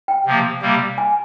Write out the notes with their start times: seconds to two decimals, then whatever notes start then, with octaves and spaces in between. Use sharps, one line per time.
0.08 G5
0.26 C3 F3 A#3
0.62 C3 G3 A#3
0.98 G#5